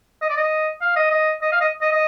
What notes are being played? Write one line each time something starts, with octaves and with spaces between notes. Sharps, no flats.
D#5
D5
D#5
F5
D#5
D#5
D#5
F5
D#5
D#5
D#5